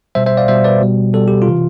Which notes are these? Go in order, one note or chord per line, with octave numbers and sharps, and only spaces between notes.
B2 G3 C5 E5
C5 E5
D5 F5
B2 G3 C5 E5
B4 D5
B2 G3
B2 G3 A4
G4
F4
C3 E3